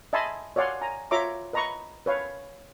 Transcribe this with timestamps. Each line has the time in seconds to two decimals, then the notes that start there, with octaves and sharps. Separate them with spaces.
0.13 D#5 E5 G#5 A5 B5 C6
0.56 C#5 D5 F5 F#5 G#5 C6
0.82 G#5 A#5
1.11 F4 C#5 E5 A#5 C6 D6
1.53 B4 D#5 A#5 B5 C#6
2.06 B4 C#5 F5